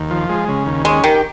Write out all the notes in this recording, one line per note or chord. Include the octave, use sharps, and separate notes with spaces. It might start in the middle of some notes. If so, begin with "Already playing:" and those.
Already playing: D#2
F3
G#3
C#3
D#2
G#3 C#4
D#3 G4